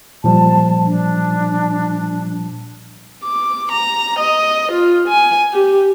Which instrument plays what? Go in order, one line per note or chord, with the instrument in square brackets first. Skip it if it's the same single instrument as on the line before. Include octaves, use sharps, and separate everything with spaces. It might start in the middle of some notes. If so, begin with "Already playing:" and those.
[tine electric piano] A#2 F3 G3 [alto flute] A5
[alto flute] D4
[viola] D6
A#5
D#5
F4
G#5
G4